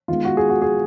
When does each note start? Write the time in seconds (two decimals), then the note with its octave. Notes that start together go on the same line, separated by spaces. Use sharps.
0.08 D#3 G#3 B3 F4
0.25 F#4
0.37 G#4
0.50 F#4
0.62 G#4